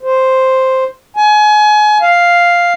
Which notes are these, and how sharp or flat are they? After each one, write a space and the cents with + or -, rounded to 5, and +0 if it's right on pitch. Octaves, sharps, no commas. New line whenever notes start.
C5 +0
G#5 +30
F5 +0